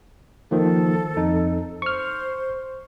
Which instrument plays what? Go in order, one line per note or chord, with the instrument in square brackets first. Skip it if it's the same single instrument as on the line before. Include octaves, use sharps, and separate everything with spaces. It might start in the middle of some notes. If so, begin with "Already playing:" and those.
[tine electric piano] D#3 F3 A#3 [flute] A4
[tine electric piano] F2 D#4
[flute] C5 [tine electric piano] C#6 F6